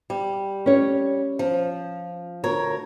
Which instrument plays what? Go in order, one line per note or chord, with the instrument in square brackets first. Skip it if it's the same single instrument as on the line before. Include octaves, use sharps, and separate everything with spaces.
[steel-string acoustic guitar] G3
[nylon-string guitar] C#4 C#5
[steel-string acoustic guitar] F3
D2 A#4 C#5